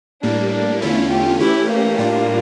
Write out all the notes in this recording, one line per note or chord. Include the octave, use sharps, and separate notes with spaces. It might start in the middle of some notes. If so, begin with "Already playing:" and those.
A2 G3 A#3 D4
D4
E2 D3 A3 C#4 E4 F4
G4
E3 A3 C#4 E4 G4
A#3
A2 G3 D4 F4